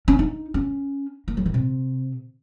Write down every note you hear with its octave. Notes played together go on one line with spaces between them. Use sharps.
C#4
D#4
C#4
A#3
F#3
D#3
C3